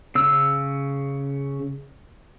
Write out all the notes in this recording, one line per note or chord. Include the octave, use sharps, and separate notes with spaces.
C#3 E6